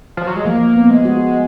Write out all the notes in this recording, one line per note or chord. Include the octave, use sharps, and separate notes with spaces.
F3
F#3
G#3
F3 A#3
B3
G#3
F#4